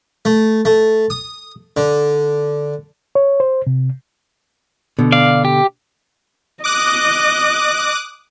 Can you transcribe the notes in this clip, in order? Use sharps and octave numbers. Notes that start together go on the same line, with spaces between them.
A3
A3
D#6
D3
C#5
C5
C3
B2 D3
D5 F5
G4
D#5 D6 D#6 F#6